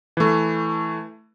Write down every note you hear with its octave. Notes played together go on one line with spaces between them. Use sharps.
E3 A3